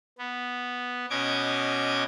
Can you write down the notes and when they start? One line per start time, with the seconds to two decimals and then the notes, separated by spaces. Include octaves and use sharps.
0.19 B3
1.10 B2 C#4 D#5 D6 G#6